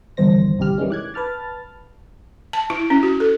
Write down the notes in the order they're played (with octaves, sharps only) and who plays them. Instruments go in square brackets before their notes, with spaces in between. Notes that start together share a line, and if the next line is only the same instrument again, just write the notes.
[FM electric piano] G1 E2 G2 D#3 C5 A#6
G1 C2 G2 G4 F6
D#3 E3 G3 G#3 C#4
D6 F#6 G#6
B4 A5 F6 A6
[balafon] A5
E4
C#4
F#4
A4